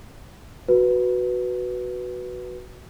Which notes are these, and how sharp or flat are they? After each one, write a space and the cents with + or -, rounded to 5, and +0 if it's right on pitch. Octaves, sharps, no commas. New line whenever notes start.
F#4 +0 B4 -5